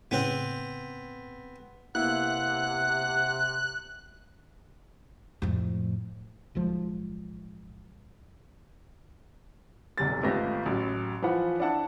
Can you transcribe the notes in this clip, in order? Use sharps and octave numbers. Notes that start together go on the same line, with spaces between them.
A2 C#3 B3 C4
C3 A#3 B3 E4 F#5 F#6
F2 A2
D1 B1 F3 G#3
F1 B1 E2 G3 A6
G#1 A3 B3 F4 G4 A#6
A1 F#3
E3 F3 B4 F#5
D4 E4 F#5 A5